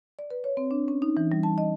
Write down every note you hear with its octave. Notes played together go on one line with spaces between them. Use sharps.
D5
B4
C#5
C4
D4
C#4
D#4
E3
G3
A5
D#5